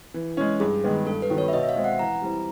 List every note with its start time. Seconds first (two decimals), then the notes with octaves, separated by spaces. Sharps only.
0.14 E3
0.37 G#3 C#4
0.60 G2 G#4
0.84 D#3 G#3 B3
1.07 G2 A4
1.22 B4
1.30 D#3 F#3 B3
1.38 C#5
1.48 E5
1.53 B2 D#5
1.63 E5
1.69 F5
1.76 G#3 C4
1.84 F#5
1.99 E3 A#5
2.22 G3 C4 E4